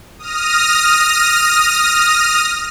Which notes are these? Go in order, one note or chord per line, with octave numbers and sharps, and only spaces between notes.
D#6 F6 A#6